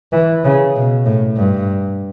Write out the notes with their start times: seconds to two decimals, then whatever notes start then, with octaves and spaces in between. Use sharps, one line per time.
0.12 E3
0.44 C#3
0.75 B2
1.06 A2
1.37 G2